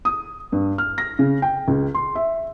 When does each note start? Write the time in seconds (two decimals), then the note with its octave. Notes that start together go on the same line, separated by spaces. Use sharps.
0.05 D#6
0.52 G2
0.78 F6
0.98 A#6
1.19 C#3
1.42 G5
1.68 C#2
1.95 C6
2.15 E5